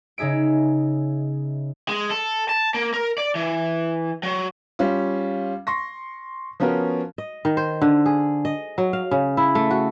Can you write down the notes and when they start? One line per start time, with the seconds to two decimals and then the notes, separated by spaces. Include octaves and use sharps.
0.18 C#3 D#4 G#4 E5 D7
1.89 G#3
2.11 A4
2.49 A5
2.74 A#3
2.94 A#4
3.18 D5
3.35 E3
4.23 F#3
4.79 G3 C#4 F4
5.67 C6 C#6 A#6
6.60 F3 B3 C#4 F#4 A#4
7.18 D#5
7.45 D#3
7.57 C5
7.82 D3
8.06 G#4
8.45 D#5
8.78 F#3
8.93 F5
9.11 C#3
9.37 E4
9.55 A3
9.70 F#4